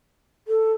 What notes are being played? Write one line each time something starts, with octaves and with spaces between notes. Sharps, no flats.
A4